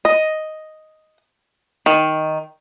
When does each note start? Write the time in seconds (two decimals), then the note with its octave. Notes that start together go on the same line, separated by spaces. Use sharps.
0.05 D#5
1.86 D#3